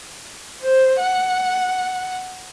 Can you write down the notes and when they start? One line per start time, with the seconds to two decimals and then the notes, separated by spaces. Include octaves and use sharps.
0.62 C5
0.99 F#5